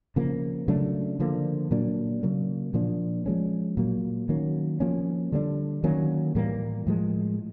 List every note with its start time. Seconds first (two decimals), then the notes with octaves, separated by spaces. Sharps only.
0.16 C#3 F3 A#3
0.68 C#3 F#3 A3 D4
1.20 D3 F3 A#3
1.71 A#2 F#3 A#3 D4
2.23 C#3 F#3 A#3
2.74 A#2 F3 A#3 D4
3.26 F3 G#3 C#4
3.77 A#2 F#3 A#3
4.29 D#3 F#3 A#3 C#4
4.80 F3 A#3 C#4
5.32 D3 G3 B3 D4
5.84 D#3 F#3 A#3 C#4
6.35 A2 E3 G3 A#3
6.87 A2 F3 G#3